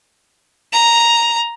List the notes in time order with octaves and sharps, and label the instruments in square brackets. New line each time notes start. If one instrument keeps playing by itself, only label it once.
[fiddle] A#5